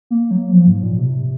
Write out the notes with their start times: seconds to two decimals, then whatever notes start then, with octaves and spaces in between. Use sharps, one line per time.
0.10 A#3
0.31 F#3
0.51 F3
0.67 G#2
0.82 A#2
0.98 C3